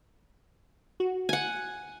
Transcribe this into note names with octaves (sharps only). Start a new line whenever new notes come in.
F#4
F#5 G#5